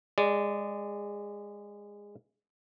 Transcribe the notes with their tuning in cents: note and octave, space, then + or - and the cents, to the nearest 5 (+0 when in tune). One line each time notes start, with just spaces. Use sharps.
G#3 -20 D5 +0